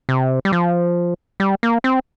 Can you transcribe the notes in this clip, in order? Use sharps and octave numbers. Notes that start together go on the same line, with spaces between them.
C3
G3
F3
G3
A#3
C4